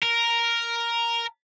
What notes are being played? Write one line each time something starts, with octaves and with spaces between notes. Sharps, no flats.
A#4